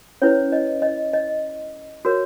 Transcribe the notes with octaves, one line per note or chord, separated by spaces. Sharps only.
C#4 E4 B4 C#5
D#5
D#5
D#5
F#4 A#4 C#5